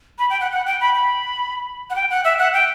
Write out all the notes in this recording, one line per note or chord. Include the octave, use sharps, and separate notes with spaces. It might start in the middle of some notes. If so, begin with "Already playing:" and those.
B5
G5
F#5
F#5
G5
B5
B5
F#5
G5
F#5
E5
F#5
G5